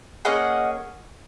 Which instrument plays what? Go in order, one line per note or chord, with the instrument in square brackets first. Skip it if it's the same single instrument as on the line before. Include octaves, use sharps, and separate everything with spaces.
[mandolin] A#3 C#4 G#4 D#5 F#5